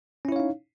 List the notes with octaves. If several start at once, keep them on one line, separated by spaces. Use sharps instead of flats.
C#4 D#4 E4 C#5 F5